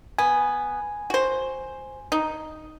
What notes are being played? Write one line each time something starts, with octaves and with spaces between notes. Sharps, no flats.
B3 G#5
F#4 C5
D#4